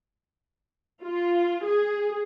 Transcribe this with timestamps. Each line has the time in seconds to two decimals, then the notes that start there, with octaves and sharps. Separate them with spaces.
1.03 F4
1.65 G#4